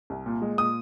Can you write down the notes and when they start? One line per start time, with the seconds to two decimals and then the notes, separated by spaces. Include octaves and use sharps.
0.10 C2
0.26 A#2
0.42 G#3
0.58 A#2 D#6